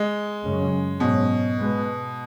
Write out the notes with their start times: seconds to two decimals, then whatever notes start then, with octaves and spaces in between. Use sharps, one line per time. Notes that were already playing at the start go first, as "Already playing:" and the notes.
Already playing: G#3
0.44 F#2 C#3 G#3 C#4
1.00 G#2 B2 F#3 C#4
1.58 B2 G#3 B3